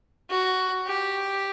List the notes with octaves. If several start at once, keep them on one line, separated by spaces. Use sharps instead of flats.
F#4
G4